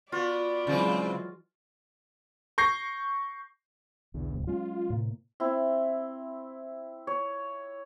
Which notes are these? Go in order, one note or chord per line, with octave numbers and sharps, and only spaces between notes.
B3 F4 F#4 D5
C#3 E3 F#3 G#3 C4
C#6 G6 A#6 C7
B1 E2 D3
D1 C2
F#3 G#3 C#4 F4
A2 C3 A#3
C4 E4
C#5